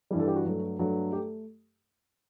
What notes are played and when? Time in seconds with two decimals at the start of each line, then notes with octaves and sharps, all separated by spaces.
0.11 G2 E3 G3
0.19 A4
0.28 G4
0.36 F#4
0.45 G2 F#3 A3
0.79 G2 F#3 A3
1.13 A3 G4